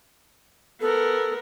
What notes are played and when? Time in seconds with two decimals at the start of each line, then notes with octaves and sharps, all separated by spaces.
0.81 B3 A4 A#4